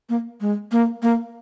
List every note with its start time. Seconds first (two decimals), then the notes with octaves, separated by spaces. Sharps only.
0.09 A#3
0.41 G#3
0.72 A#3
1.03 A#3